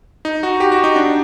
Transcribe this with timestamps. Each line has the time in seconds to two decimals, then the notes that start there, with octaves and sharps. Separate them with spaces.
0.25 D#4
0.43 F#4
0.60 G4
0.72 F#4
0.84 D#4
0.96 D4